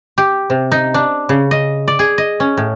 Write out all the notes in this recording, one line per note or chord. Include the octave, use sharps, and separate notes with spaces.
G4
C3
D#4
D4
C#3
D#5
D5
G#4
D#5
C#4
A2